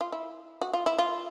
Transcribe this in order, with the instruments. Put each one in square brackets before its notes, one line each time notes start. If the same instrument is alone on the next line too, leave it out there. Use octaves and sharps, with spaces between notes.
[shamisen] F4
E4
F#4
F4
E4
F4